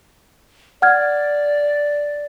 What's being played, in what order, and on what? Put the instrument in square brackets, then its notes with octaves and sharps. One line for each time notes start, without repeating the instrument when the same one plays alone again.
[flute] D5 [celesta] F#5 F6 G#6